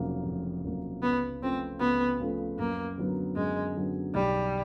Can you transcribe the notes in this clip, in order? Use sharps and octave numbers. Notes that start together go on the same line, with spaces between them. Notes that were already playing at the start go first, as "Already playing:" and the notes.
Already playing: F1 F2 C#3 F#3 A#3
F1
F2 C#3 F#3 A#3
C#2 B3
C#3 F3 A3 C4
C#2 B3
C#3 F3 A3
F#2 A#3
D3 F#3 B3
F#2 G#3
D3 F#3 B3
B1 G3